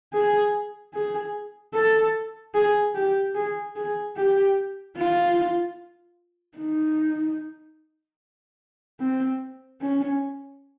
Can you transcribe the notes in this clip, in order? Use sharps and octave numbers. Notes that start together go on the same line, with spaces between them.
G#4
G#4
A4
G#4
G4
G#4
G#4
G4
F4
D#4
C4
C#4